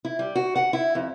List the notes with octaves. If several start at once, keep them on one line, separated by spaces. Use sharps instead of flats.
E4
G3
F#4
F#5
E4
F2